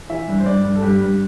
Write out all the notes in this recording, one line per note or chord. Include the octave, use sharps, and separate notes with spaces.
E3 E5
G2
C5
G2 D5
G2
A4
G2 G4
G2